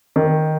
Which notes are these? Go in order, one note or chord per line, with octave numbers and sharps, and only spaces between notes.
D#3